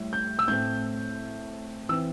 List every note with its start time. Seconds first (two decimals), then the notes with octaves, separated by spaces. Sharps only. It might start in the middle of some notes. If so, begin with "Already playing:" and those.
Already playing: A2 G3
0.13 G6
0.39 E6
0.48 A2 A3 C4 G6
1.89 E3 C4 E6